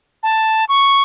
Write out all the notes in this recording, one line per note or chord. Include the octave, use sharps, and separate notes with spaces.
A5
C#6